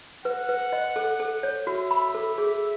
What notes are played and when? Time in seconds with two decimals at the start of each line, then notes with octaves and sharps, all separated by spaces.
0.25 B4 F#5
0.49 B4
0.72 D#5
0.96 A4
1.20 A4
1.43 C#5
1.67 F#4 E5
1.91 B5
2.14 A4
2.38 G#4